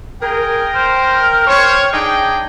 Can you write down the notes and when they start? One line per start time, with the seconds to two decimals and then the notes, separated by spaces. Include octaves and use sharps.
0.22 G#4 A#4 G5
0.74 C5 F6
1.47 C5 C#5
1.93 D4 D#4 G#4 G5